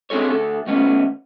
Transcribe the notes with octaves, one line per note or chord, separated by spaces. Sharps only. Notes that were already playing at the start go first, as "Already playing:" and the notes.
C4 D4 G#4 A4 C#5
D2 A4
D#3 A3 B3 C#4